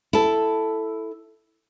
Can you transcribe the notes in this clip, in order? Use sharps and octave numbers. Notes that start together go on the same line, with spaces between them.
E4 A4